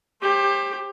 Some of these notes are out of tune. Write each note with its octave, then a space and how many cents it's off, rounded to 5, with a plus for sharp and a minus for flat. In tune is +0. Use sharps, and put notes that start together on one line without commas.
G4 +20 C5 +35